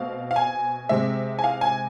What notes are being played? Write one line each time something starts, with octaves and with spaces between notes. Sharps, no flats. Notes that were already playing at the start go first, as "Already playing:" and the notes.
Already playing: B2 A3 C4 F5
F5
G#5
C3 G#3 C4 E5
G#5
F5
G#5